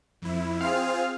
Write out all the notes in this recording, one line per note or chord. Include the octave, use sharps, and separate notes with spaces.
F2 E4
C4 F4 G#4 F5